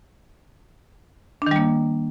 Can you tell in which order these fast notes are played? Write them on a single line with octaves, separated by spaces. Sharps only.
D4 D#3 G3 A#3